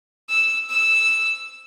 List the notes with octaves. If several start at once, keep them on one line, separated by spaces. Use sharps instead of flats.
E6
E6